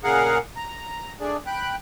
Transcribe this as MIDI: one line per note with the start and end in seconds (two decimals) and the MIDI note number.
0.04 0.38 46
0.04 0.38 49
0.04 0.38 68
0.04 0.38 70
0.04 0.38 77
0.04 0.38 78
0.56 1.13 82
1.20 1.37 57
1.20 1.37 62
1.20 1.37 68
1.20 1.37 74
1.46 1.76 79
1.46 1.76 83
1.46 1.76 90